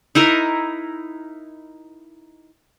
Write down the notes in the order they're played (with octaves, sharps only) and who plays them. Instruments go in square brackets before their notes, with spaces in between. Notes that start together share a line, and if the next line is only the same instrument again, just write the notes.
[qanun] D#4 E4 A#4 C#6